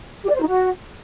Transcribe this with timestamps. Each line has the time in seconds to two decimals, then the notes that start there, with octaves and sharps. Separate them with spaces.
0.23 G4
0.29 D5
0.35 C5
0.41 D#4
0.47 F#4